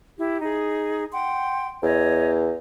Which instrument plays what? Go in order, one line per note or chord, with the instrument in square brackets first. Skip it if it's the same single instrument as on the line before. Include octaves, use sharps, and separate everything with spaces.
[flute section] E4 G4
D#4 G#4
F#5 G5 C6
[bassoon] E2 [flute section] C#5 D#5